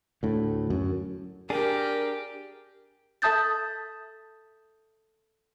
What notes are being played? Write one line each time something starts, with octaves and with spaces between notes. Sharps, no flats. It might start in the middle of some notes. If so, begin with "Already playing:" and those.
D2 A2
F#2
D4 G4 G#4 A#4
A4 E5 A5 D#6 G6 A6